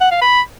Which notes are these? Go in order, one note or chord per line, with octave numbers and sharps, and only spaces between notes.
F#5
F5
B5